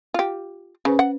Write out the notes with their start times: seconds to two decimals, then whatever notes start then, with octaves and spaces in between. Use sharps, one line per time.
0.14 F4 G4
0.85 C#3 C#4 B4 C5
0.99 F#5